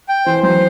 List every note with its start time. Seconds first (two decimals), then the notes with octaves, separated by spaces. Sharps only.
0.09 G5
0.26 E3 C5
0.43 F#3 C5